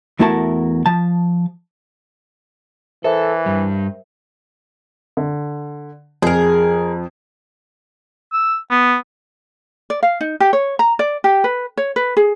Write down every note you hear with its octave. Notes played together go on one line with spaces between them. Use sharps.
E2 A3 E4 F#4 A#4 A5
F3 A5
E3 A4 A#4 C5 E5
G2 G3
D3
F2 G#4 A#4
E6
B3
D5
F5
D#4
G4
C#5
A#5
D5
G4
B4
C#5
B4
G#4